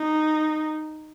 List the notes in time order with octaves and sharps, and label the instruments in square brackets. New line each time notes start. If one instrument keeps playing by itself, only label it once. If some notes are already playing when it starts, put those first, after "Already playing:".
Already playing: [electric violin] D#4